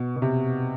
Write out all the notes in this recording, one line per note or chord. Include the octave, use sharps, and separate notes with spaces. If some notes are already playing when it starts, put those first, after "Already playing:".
Already playing: B2
B2
C3